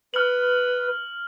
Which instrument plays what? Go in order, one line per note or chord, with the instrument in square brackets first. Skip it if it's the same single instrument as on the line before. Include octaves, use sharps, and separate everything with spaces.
[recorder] B4 [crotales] F6 F#7